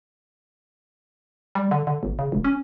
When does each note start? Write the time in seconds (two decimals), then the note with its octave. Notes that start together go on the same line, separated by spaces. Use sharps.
1.55 G3
1.71 D3
1.87 D3
2.03 G1
2.19 C#3
2.32 E1
2.44 C#4